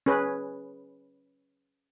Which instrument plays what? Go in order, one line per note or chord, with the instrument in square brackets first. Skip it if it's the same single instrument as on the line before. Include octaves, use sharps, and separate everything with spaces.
[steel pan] C#4 G#4 B4